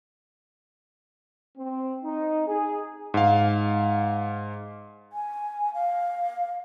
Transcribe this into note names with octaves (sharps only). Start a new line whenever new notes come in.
C4
D#4
G#4
G#2 F5
G#5
F5